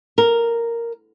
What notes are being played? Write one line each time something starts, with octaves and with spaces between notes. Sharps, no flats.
A#4